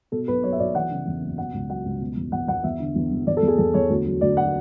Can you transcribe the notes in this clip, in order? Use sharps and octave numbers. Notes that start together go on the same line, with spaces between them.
B2 A4
B1 B4
F#3 C#5
E5
B1 D5
E3 F#5
C#3
E2
F#1
B2 F#5
C#2
F#3 F#5
C#2
B2
E2
E2 F#5
E2 F#5
E2 E5
D3
E2
E1
E2 D5
A4
E2
G#4
E2 A4
E2 C#5
D2
F#3
D2 D5
F#5